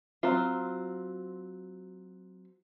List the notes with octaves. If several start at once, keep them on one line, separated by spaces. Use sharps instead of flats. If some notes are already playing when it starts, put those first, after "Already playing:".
F#3 C4 F4